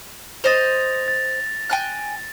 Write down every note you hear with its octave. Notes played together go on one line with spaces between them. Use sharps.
C5 D#5 A6 A#6 F7
A6
G5 G#5 F#6